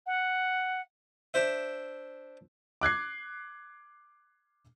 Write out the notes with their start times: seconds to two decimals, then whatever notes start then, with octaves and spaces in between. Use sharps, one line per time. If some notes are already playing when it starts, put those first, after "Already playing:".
0.06 F#5
1.34 D4 C5 E5
2.81 D6 F#6 G#6 C7